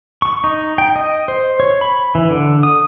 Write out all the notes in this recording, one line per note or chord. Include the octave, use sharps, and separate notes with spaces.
C#6
D#4
G5
D#5
C5
C#5
B5
E3
D3
D#6